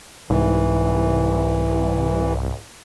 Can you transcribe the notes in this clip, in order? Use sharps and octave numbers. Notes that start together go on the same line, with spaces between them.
C2 G#2 E3